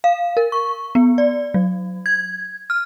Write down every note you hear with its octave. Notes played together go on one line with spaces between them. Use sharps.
F5
A#4
C#6
B3
D5
F#3
G#6
F6